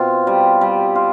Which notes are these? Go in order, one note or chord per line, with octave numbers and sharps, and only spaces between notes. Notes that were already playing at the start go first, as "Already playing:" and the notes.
Already playing: B2 C4 F4
G3
G3
F4